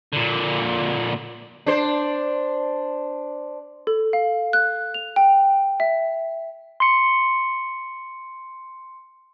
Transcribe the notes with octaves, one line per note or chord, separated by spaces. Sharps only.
A#2 D3
D4 C5
A4
F5
F#6
F7
G5
E5
C6 C#7